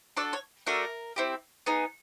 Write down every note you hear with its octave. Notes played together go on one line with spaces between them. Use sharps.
D4 F#4 A4 D5
C#5
A3 D4 F#4 A4 A#4
C4 E4 G4
B3 D#4 G#4